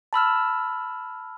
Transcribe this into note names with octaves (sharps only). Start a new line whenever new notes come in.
A5 B5 E6 F6